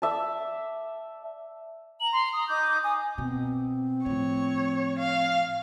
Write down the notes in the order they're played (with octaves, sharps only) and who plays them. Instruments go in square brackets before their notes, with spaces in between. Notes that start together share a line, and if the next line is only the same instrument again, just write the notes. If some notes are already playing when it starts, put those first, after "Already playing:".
[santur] D5 E5 A5
[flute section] A#5 [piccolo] F#7
[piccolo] C6
D#6
[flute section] D#4 D6 [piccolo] G6
[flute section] G#5 [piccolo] D#6
[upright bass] B2 [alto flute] C4
[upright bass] A2 F3 [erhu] C#5
[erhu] F5